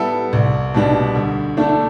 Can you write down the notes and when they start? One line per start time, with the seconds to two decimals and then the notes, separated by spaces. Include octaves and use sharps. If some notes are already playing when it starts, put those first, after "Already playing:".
Already playing: G3 B3 E4 A4
0.33 C2
0.74 B2 G3 D4
1.15 D2
1.57 D3 A3 D4